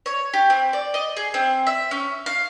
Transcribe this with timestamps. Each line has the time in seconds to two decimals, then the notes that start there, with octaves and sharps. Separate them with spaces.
0.06 C#5
0.33 G4
0.50 C4
0.73 D5
0.94 D#5
1.17 G#4
1.34 C4
1.67 E5
1.91 C#4
2.26 F5